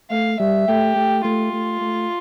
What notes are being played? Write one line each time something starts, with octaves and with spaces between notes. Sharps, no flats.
A3 F5
G3 E5
A3 G4
A3
A3 F4
A3
A3